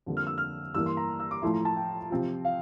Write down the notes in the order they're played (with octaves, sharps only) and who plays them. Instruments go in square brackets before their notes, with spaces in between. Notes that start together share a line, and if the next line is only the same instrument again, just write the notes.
[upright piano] F2 D3 G3 A#3
[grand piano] F6
E6
F6
[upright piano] G2 E3 A#3 [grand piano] E6
[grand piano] C6
A#5
E6
D6
[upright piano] A2 F3 A3 E4 [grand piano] C6
[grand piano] A#5
A5
G5
[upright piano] C3 F3 C4 F4
[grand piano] F5